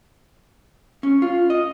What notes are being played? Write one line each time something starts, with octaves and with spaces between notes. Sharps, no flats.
C#4
F4
D#5